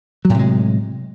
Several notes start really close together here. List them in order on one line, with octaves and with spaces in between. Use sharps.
F#3 A2 C3 G#3